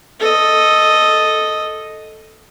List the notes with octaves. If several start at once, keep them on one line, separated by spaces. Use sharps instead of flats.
A4 D#5